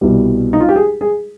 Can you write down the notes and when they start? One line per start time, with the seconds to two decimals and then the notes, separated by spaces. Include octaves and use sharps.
0.01 C2 B2 G3
0.53 D#4
0.60 F4
0.69 G4
0.76 G#4
1.01 G#4